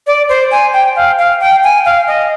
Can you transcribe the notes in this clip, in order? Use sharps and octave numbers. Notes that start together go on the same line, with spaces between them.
D5
C5
G#5
G5
F5
F5
G5
G#5
F5
D#5